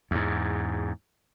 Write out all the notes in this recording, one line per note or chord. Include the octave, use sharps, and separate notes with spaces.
E2 G#2